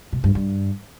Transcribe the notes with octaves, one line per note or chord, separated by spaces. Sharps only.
B2
G2
G2